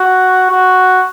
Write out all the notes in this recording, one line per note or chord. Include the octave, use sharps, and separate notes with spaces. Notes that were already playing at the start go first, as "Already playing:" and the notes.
Already playing: F#4
F#4